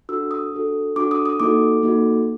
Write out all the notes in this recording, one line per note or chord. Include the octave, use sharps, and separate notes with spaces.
D4 F#4 A4 E6
D#6
D4 F#4 A4
D4 F#4 A4 D6
D#6
D#6
A#3 D#4 F#4 A4 D6
A#3 D#4 F#4 A4